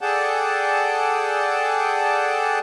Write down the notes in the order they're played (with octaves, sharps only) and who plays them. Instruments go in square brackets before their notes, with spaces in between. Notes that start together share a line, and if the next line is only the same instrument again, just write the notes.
[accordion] G#4 A4 D5 F#5 G5 A5